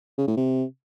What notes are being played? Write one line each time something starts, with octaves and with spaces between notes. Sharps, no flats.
C#3
A2
C3